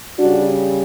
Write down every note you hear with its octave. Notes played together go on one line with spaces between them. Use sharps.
C#3 G3 D4 F#4